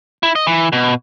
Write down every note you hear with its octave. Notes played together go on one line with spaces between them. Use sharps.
E4
D#5
E3
B2